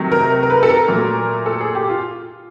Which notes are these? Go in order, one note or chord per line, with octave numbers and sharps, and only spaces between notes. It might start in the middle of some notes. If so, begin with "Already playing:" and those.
Already playing: C3 D#3 F#3 A3
A#4
A#4
B4
A4
A#4
A#2 F#3 A3
A4
G#4
G4
F4